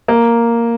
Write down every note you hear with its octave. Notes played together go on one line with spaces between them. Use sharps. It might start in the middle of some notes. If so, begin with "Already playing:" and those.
A#3